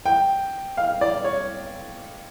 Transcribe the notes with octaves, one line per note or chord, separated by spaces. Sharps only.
G5
F5
D5
C#5